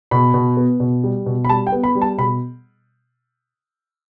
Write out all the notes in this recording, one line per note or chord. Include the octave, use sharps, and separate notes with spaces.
B2 B5
B2
B3
B2
G3
B2
B5
G3 A5
G5
B3
B5
G3
A5
B2 B5